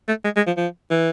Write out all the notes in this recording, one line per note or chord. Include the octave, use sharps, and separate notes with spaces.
A3
G#3
G#3
F3
F3
E3